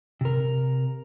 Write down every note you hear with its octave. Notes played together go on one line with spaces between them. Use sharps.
C3 A#4